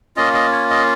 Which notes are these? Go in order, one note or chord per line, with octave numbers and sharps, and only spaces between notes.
A#3 C#4 F4 D#5
D#5
C#5
D#5